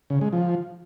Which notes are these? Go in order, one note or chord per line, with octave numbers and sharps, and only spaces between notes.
C#3
G#3
F3